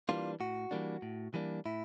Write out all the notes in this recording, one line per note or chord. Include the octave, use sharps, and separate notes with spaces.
E3 G3 A#3 D4 F4
A2 F#4
E3 G3 A#3 D4
A2
E3 G3 A#3 D4
A2 E4